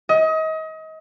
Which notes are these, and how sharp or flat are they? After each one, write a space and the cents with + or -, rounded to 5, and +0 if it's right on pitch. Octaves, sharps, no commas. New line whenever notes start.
D#5 +30